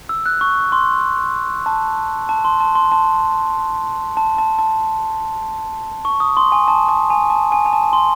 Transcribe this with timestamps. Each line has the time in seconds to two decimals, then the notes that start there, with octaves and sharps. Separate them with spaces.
0.09 E6
0.26 F#6
0.41 C#6
0.72 C6
1.66 A5
2.29 A5
2.45 C6
2.60 A5
2.75 C6
2.92 A5
4.17 A5
4.38 A5
4.59 A5
6.05 C#6
6.20 D#6
6.37 C6
6.52 G#5
6.68 A5
6.89 A5
7.10 G#5
7.30 A5
7.52 G#5
7.66 G#5
7.73 A5
7.93 C6